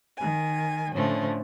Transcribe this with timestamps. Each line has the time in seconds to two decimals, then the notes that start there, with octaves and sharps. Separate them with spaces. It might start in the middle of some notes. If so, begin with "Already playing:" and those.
0.17 D#3 G#5
0.95 A2 D3 F3 A3 C#4